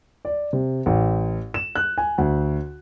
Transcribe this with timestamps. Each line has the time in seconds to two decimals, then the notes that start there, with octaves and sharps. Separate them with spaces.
0.25 D5
0.53 C3
0.86 A1
1.54 E7
1.75 F#6
1.98 G#5
2.18 D2